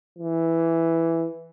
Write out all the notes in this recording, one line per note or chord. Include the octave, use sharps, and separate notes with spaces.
E3